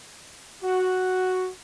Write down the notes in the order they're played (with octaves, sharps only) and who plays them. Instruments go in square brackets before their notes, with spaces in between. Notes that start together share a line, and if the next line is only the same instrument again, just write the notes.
[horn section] F#4